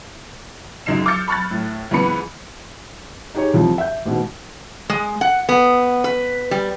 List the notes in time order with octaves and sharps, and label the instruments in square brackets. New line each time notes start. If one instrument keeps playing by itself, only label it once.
[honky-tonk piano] C#2 F#2 D#4 C7 E7
D6 E6 F6 G6 A6 C#7
B5 C#6 F6 F#6 A6
A2
C#2 G#2 E3 B3 B5 C#7
[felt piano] D#4 G4 G#4 C#5
C2 F3 C4
E5 G6
A1 G#2 B2
[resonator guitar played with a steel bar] G#3
F#5
B3
B4
G3